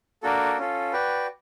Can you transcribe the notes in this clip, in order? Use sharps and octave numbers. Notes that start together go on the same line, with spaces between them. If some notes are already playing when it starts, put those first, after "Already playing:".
A#3 D4 F#4 A4
C#4 F4 A4
F#4 B4 D5 G5